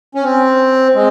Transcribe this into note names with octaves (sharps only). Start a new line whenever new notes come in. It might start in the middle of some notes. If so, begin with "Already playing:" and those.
C#4
C4
G#3